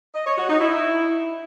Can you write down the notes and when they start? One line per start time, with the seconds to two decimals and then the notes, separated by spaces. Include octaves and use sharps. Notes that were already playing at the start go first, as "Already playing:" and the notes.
0.15 D#5
0.26 C#5
0.38 F#4
0.49 D#4
0.61 E4